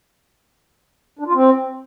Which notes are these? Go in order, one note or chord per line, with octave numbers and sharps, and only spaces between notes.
D4
F4
C4